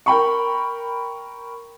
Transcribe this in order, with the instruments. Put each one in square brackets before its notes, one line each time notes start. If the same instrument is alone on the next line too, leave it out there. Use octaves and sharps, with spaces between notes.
[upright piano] A#4 G5 B5 C#6